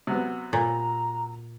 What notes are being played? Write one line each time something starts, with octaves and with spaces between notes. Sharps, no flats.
C3 F#3 B3
A#2 A#5